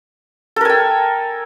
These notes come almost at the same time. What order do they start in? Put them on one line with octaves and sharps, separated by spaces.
A4 A#4 G#5 G5